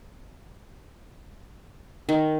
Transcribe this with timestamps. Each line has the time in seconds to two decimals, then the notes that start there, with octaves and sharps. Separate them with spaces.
2.09 D#3